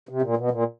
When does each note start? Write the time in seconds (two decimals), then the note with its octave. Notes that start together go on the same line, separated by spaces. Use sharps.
0.09 C3
0.22 A#2
0.37 B2
0.51 A#2